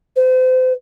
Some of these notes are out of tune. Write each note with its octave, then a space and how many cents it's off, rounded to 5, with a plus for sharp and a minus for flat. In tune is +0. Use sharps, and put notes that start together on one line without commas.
C5 -35